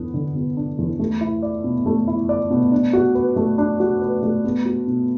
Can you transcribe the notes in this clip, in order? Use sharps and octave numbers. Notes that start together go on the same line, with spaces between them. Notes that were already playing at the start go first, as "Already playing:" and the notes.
Already playing: E2 D3 B3 D4
D3
B3
D4
E2
A3
E4
D5
B2
A3
E4
D5
B2
D4
F#4
B4
A3
D4
F#4
B4
A3
B3
F#4
B2